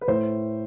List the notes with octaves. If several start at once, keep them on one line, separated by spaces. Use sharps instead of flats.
B4
A2 C5